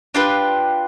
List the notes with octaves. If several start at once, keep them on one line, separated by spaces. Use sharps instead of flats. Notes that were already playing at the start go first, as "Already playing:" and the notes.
D4 F4 G4 B4